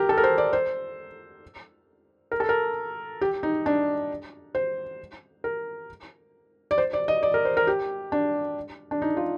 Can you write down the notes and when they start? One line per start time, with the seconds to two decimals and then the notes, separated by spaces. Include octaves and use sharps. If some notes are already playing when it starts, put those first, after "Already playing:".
Already playing: G4 A#4
0.09 A4
0.17 A#4
0.24 C5
0.38 D5
0.53 C5
2.31 A#4
2.40 A4
2.49 A#4
3.21 G4
3.43 D#4
3.66 D4
4.55 C5
5.44 A#4
6.71 D5
6.78 C5
6.93 D5
7.08 D#5
7.23 D5
7.34 A#4
7.45 C5
7.57 A#4
7.67 G4
8.12 D4
8.91 D4
9.02 D#4
9.17 F4